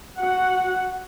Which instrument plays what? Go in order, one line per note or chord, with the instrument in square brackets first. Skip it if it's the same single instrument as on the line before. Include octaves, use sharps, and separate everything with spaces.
[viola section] F#4 F#5